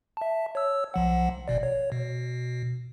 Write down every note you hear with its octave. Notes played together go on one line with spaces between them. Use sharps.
E5 A5
C#5 E6
B1 F3 F#5
G1 B2 D5
C#5
B2